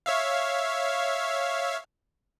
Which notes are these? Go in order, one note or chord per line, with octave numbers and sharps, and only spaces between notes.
C#5 E5 F5